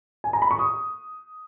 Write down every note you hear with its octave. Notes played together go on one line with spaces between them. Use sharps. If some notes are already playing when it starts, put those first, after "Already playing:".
G#5
A#5
B5
C#6
D#6